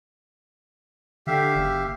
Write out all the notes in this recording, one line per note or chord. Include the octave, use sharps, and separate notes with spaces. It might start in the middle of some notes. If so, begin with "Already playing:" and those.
D3 G4 E5 F5
F#1